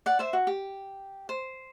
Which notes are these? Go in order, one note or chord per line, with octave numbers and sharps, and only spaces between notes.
D5 F#5
C5 E5
F#4
G4
C5